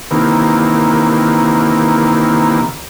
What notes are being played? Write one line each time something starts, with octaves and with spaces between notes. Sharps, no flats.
C3 D#3 E3 A#3